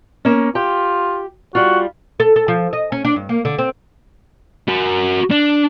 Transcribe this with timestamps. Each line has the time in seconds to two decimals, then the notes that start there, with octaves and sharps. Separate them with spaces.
0.25 A#3 C#4
0.55 F4 G4 G5
1.55 G3 F4 F#4
2.20 A4
2.36 A4
2.48 F3
2.73 D#5
2.92 C#4
3.05 D4
3.16 G2
3.29 A#3
3.45 D3
3.58 C4
4.68 F#4 A#4
5.31 D4